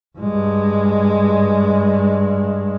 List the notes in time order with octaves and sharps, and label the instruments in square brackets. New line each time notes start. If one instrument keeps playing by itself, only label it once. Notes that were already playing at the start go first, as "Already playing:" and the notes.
[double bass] G2 G#3